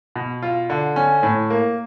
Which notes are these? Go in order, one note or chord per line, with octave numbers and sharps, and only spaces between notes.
B2
F4
D3
C#4
A2
A#3